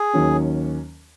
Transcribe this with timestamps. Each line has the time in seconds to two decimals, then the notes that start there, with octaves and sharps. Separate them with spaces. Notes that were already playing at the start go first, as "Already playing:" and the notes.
Already playing: G#4
0.14 D#2 D#3 F#3 C#4